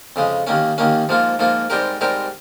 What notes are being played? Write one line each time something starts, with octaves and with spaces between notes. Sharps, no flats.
F2 C#3 G#3
D#2 D#3 A#3 C#4
D#2 D#3 A#3 C#4
G#2 F3 A#3 F4
G#2 F3 A#3 F4
G#2 G3 C4 G4 A#4
G#2 G3 C4 G4 A#4